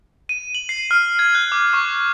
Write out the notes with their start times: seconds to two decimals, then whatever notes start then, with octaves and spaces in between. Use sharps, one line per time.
0.29 D#7
0.55 F#7
0.69 C7
0.91 F6
1.19 G#6
1.35 F#6
1.52 D6
1.73 C#6